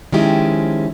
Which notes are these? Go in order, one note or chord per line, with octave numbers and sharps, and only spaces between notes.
D#3 F3 G#3 C#4 E4 G4